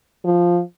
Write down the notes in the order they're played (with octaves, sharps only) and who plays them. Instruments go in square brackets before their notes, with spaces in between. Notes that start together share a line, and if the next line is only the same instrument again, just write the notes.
[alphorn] F3